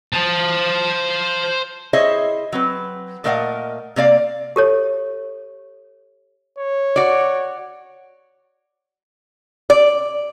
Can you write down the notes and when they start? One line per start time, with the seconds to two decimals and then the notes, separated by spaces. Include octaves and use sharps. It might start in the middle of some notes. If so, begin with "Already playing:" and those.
0.13 C5 A5
1.93 E4 G#4 C5 C#5 D#5 E5
2.52 F#3 C4 B4
3.24 A#2 A3 A#4 D#5 F5 F#5
3.96 C3 A#3 D5 F5
4.56 G4 A4 C#5
6.58 C#5
6.96 F#4 D5
9.70 D5